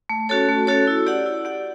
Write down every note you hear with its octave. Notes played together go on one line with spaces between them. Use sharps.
A3
C#4 F#4 A4 C#5
A3
C#4 F#4 A4 C#5
E4
G4 D5 F#5
E4
G4 D5 F#5